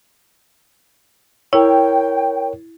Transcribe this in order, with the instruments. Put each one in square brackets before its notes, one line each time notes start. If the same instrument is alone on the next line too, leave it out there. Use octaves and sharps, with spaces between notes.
[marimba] E4 [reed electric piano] A#4 C#5 [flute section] G5